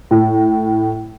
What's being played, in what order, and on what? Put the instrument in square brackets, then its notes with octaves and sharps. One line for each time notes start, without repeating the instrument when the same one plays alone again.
[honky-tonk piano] A2